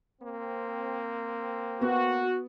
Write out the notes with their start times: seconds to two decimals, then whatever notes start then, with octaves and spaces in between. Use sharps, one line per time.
0.21 A#3 C4
1.81 B3 F#4